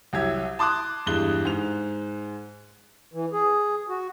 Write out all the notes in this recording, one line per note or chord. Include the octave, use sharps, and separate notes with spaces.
C2 F#3 G4 E5 G#6
A5 C6 D6 D#6 F#6
E2 G2 G#3 F#6 G7
G#2 F7
E3
G#4
F#4